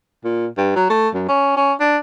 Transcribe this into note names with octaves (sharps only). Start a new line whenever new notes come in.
A#2
G2
F#3
A3
F#2
C#4
C#4
D4